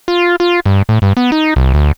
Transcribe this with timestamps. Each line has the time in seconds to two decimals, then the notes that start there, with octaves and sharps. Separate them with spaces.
0.08 F4
0.40 F4
0.66 G2
0.89 A2
1.02 G2
1.17 B3
1.32 D#4
1.56 C2
1.74 D2